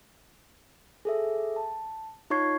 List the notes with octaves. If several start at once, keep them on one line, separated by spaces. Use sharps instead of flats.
G#4 A4 E5
A5
D#4 F4 C#5 C#6 G#6 C7